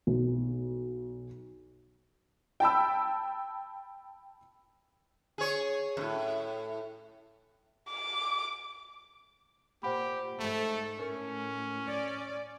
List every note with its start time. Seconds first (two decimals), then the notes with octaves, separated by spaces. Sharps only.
0.07 B1
2.60 G5 A5 B5 E6
5.38 G#4 C#5
5.97 F#2 A2
7.90 D6
9.83 A#2 G4 C5 F#5 B5
10.39 G#2 A3 A4
10.99 A2 C#4 A#4 C#7
11.88 D5